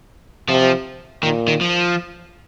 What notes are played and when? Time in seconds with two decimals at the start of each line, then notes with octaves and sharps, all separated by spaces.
0.49 C3 F3
1.23 A#2 D#3
1.48 D#3
1.61 F3